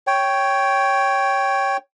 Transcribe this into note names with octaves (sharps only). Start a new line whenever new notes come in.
C#5 G5